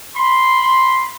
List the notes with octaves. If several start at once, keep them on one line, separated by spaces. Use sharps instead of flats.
B5 C6